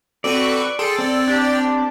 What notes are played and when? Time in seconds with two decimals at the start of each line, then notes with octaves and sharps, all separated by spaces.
0.24 C4 F#4 A4 B4 D5 C#6
0.79 G#4 A4 G5 C6
0.99 C4 D5 G5
1.27 D4 G4